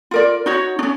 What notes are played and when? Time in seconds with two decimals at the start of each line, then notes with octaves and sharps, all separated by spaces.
0.11 F4 A#4 D5
0.46 D#4 F#4 C#5
0.79 C#4 D4